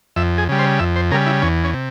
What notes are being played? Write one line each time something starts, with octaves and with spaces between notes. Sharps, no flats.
F2 E5
G#4
C#3 G3
C5
F2 E5
C5
C#3 G3 A#4
E4
E2 C#4
C#4
C3